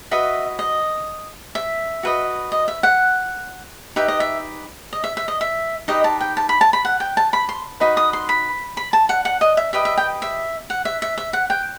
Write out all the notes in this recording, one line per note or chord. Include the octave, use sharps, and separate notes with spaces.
F#4 B4 D#5 E5
D#5
E5
F#4 B4 D#5
D#5
E5
F#5
D#4 G4 B4 E5
D#5
E5
D#5
E5
E5
D#5
E5
D#4 G4 B4 D#5
A5
G5
A5
B5
A5
B5
F#5
G5
A5
B5
C6
D#4 F#4 B4 D#5 B5
D#6
C6
B5
B5
A5
F#5
F#5
D#5
E5
G4 B4 D#5 E5
E5
G5
E5
F#5
E5
E5
E5
F#5
G5